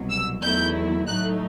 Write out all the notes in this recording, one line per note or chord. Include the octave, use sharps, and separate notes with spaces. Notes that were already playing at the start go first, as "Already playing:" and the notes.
Already playing: C2 B2 F#3
E6
E2 D#3 F#3 A3 E4 G6
A2 F#3 A3 D#4 F#6